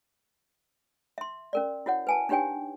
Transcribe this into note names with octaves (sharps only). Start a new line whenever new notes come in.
E5 C6
C#4 A#4 D5
E4 F#4 C#5 F#5
B4 G#5 A5
D4 D#4 G4 C#5 G5 G#5